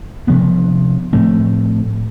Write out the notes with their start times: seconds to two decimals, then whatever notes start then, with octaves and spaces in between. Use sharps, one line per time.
0.27 C3 F3 B3 D4
1.13 A2 F3 A3 C4